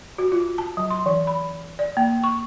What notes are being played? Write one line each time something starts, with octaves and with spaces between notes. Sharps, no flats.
F#4
F4
A5
F#3
C6
E3
B5
D5
A#3
C#6